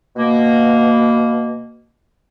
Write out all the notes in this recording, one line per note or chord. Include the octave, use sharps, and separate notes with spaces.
B2 A#3